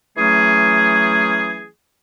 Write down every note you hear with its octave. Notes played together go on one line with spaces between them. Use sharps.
E3 F#3 A3 C#4 G#4